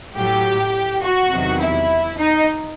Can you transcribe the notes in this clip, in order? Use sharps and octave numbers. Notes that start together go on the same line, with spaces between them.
A2 F#3 G4
F#4
E2 C3 D#3 F#3
E4
D#4